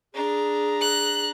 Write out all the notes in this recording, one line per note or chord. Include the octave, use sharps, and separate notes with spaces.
D4 G#4 A#5
F#6